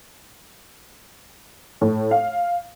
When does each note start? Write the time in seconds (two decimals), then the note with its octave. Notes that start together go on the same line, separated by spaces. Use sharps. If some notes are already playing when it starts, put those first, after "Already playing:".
1.81 A2
2.11 F5